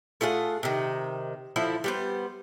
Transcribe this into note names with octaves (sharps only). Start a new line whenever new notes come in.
A3 F4 G#4 F#5
C3 D#3
D3 F3 E4
G3 B3 C5